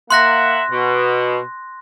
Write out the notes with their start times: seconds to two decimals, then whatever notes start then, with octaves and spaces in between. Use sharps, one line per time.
0.11 A#3 E5 F#5 C6 F#6 A#6
0.71 B2